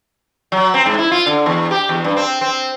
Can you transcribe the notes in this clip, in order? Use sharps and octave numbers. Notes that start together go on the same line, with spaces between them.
F#3
C4
G#2
E4
F4
D3
E2
G4
E2
G2
C4
C4